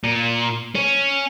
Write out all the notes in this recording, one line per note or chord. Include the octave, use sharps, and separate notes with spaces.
A#2
C#4